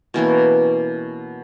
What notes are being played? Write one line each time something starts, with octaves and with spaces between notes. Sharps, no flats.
B2 E3 A#3 C#4